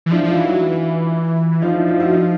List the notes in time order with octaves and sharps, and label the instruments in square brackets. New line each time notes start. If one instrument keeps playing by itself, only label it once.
[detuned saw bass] E3
[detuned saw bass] F3 [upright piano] D4 E4
[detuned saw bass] F3 [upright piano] D#4 F4
[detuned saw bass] E3
[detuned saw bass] F#3 [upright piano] E4 F#4
[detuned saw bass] E3
[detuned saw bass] F3 [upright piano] D#4 F4
[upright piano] D4 E4
D#4 F4
E4 F#4
D#4 F4